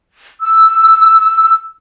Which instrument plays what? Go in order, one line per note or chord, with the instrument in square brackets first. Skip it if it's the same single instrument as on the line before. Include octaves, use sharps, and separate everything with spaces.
[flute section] E6